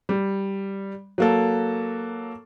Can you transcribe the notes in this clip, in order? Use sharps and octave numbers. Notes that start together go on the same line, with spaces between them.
G3
F#3 A#3 A4